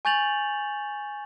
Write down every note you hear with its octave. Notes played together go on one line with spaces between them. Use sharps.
G#5 C#6 G6 A6 F7 F#7